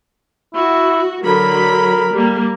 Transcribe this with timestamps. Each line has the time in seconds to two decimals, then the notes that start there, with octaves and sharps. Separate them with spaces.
0.55 E4 F#4
1.24 D3 F#3 A#4 B5
2.13 G3 A#3